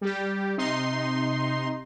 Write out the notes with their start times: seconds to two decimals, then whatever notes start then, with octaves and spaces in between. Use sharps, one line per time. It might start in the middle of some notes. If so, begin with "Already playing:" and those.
0.01 G3 G4
0.57 C3 D#4 C6